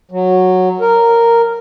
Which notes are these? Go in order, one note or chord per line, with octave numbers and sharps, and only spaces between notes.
F#3
A#4